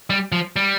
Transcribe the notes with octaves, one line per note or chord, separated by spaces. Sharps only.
G3
F3
G3